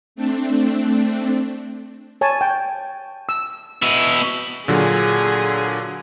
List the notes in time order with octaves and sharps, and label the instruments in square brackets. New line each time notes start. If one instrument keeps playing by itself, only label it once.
[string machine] A3 C4 D4
[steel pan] C#5 G#5 A5
G5
E6
[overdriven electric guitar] B2 E4
[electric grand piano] A#2 D3 F#3 [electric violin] G#4